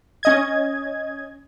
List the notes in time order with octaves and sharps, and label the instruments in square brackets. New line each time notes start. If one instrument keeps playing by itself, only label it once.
[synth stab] C#4 D#5 G#6